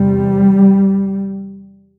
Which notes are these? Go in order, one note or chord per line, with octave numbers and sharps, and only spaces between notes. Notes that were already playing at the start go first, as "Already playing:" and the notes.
Already playing: E2 C3 G3